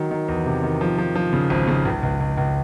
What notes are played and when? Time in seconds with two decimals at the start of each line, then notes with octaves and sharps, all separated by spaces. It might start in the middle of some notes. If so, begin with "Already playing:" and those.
Already playing: D#3 F#3
0.11 D#3
0.28 E2
0.46 C3
0.63 D#3
0.81 F3
0.98 F3
1.15 F3
1.33 C#3
1.50 G#1
1.68 C#3
1.85 C#2
2.03 C#2
2.20 C#2
2.38 C#2